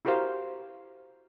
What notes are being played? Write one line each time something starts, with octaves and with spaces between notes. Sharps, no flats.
E4 F#4 G4 A#4 C5 F5